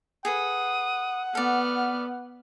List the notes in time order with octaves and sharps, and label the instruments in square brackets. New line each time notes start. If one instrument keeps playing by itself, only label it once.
[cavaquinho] G#4 A4 B4 [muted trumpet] F#5 [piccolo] D#6
[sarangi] B3 [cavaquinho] A4 D5 [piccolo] F6